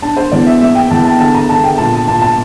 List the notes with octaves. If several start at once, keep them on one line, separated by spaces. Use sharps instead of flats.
D4 A5
C5
E2 D5
E5
A#3 E5
G5
E2 A5
A5
D3 A5
A#5
D3 A5
G5
A#2 A5
A5
A#2 A5
A5